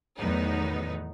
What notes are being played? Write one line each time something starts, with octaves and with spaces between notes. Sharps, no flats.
E2 A2 D#3 F#3 B3 D#4